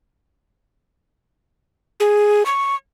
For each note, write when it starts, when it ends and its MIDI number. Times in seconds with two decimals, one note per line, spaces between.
2.00 2.43 68
2.46 2.75 85